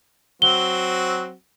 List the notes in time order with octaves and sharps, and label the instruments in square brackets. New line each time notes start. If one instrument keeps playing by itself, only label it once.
[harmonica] F#3 C4 F#4 [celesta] G7